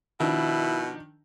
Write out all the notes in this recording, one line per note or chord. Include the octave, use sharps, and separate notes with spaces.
B2 D#3 F3 D4 E4